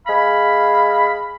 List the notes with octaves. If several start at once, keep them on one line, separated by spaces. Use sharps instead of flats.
G#3 F5 B5